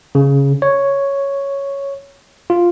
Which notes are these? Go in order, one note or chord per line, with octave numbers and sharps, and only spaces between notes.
C#3
C#5
F4